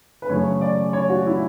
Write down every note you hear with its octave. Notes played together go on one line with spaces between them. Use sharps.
B4
F#2 C#3 E3 A3 C#4 C#5
D5
C#5
F#4
E4